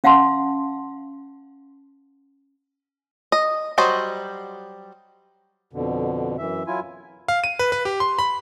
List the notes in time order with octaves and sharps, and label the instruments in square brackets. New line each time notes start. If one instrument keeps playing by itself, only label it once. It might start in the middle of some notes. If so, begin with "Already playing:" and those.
[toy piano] C#4 F5 F#5 A5 C6
[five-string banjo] D#5
F#3 G3 F#4 C5 D#5
[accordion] F2 B2 D3
F#2 E3 E5
F#3 E4 F4 G#5
[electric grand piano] F5
D#7
B4
B4
G4
C6
B5